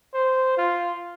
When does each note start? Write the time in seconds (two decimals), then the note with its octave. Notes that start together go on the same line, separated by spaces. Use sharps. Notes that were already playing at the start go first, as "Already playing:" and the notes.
0.14 C5
0.58 F4